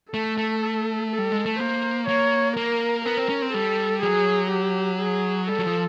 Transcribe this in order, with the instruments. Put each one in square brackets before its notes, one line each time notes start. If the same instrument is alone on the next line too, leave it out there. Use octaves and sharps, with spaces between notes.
[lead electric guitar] A3 [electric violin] A4
[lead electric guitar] A3
[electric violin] A4
[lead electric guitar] G3
G#3
A3
[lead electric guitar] A#3 [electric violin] C5
[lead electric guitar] A#3 [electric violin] C#5
[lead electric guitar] A#3 [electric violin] A#4
[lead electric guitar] B3 [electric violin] A#4
[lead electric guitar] C4
C#4
C4
[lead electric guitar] G3 [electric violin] A4
[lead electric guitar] F#3 [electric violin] G#4
[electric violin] G4
G#4
[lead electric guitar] G3 [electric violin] A4
[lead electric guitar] F#3
F3